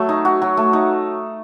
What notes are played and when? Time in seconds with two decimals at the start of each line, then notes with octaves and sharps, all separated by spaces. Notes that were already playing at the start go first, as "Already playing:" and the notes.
Already playing: F#3 A3
0.09 D#4
0.25 F#4
0.42 F#3
0.57 A3
0.73 D#4